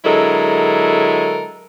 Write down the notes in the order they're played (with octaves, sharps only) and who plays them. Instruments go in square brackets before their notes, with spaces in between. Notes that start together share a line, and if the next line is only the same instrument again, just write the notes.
[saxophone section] D3 F#3 G#3 E4 A4 A#4